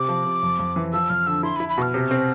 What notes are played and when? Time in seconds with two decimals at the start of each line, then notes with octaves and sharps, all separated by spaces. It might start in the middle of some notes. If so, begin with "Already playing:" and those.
Already playing: C3 D6
0.09 F3
0.25 C3
0.43 F2
0.59 F2
0.76 E3
0.93 F3 E6
1.10 F2 F6
1.27 D3 E6
1.43 E4 C6
1.56 E4 B5
1.69 B5
1.78 B2 F6
1.94 C3
2.11 C4